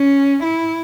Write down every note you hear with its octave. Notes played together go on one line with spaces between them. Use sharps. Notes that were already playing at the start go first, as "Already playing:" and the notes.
Already playing: C#4
E4